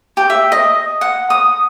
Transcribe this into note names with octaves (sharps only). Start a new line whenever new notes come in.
G4
E5
D#5
F#5
D#6